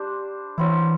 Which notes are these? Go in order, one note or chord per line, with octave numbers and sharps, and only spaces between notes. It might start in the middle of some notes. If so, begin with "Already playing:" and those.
Already playing: G3 D4 C5
E3 F#3 C4 E4